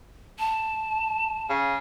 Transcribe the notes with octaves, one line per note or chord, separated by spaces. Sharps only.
A5
C#3